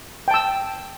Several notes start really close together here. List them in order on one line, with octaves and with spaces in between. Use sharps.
G5 A5 E6